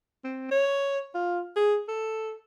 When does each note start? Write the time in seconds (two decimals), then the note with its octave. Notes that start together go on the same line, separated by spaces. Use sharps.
0.24 C4
0.51 C#5
1.14 F4
1.56 G#4
1.88 A4